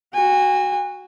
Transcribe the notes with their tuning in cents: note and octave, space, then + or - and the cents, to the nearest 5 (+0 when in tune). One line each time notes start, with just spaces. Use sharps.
F#4 +0 G#5 -35